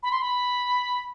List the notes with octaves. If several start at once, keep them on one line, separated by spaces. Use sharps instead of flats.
B5
C6
B5